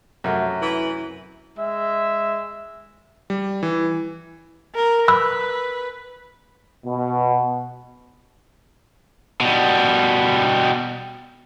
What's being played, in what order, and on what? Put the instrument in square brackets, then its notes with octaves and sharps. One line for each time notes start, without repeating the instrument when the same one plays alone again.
[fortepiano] F#2 [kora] C3 F#3 A3
[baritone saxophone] E3
[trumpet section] G#3 E5
[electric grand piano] G3
E3
[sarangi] A#4
[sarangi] B4 [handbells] B5 E6 F#6
[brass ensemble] B2
[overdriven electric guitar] B2 G3